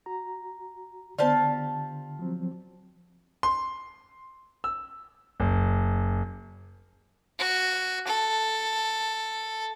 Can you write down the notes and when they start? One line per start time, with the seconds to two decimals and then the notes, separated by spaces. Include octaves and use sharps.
0.06 F#4 A#5
1.19 D3 B3 F4 G4 C5 D5 A5
2.19 F3 F#3 C4
3.43 C6
4.64 E6
5.40 F#1
7.39 F#4
8.07 A4